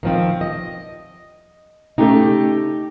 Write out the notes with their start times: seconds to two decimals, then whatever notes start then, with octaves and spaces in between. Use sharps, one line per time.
0.03 D#3 F3 C4
0.41 D#5
1.98 C#3 A3 D#4 G4